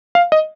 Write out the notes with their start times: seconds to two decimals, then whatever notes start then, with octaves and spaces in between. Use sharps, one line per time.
0.15 F5
0.32 D#5